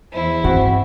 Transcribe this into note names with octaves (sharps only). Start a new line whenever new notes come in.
E2 E4 C5
G2 C4 F#4